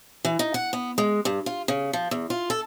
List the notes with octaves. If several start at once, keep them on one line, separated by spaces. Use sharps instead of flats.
E3
D#4
F#5
B3
G#3
G2
F4
C#3
F3
E2
F4
A4